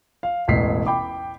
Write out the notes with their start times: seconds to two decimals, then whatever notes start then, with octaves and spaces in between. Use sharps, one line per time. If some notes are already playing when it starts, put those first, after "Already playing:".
0.23 F5
0.48 E1 A1 B6 C7
0.87 G5 B5 D6